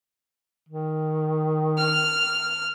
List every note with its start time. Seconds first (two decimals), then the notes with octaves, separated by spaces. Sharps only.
0.69 D#3
1.78 F6